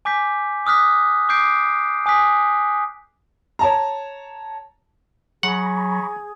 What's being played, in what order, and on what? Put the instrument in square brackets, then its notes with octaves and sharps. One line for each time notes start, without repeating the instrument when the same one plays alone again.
[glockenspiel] G#5 D6 G6 B6
D6 D#6 F6 F#6 B6
D6 D#6 G6 C7 D7
G#5 D#6 F#6 B6
[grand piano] C#5 A5 A#5
[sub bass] F#3 [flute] G#4 [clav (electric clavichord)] F#5 [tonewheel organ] A#5 B5 C#6